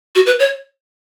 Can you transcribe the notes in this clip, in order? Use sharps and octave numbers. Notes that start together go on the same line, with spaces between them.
F#4
B4
C#5